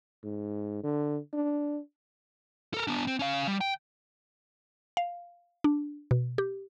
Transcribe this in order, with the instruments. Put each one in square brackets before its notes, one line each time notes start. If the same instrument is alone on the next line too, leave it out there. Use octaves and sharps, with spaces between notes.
[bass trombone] G#2
D3
D4
[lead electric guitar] A4 A#4
B3 D4
C4
C#4 F5
G3
G5
[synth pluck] F5
D4
B2
G4